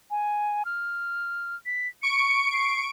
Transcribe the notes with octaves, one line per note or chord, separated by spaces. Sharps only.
G#5
F6
B6
C#6 C#7 D7
C7